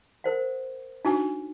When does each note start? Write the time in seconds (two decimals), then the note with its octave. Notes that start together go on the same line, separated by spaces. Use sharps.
0.24 A#4 C5 F#5
1.05 D4 D#4 F#4 G#5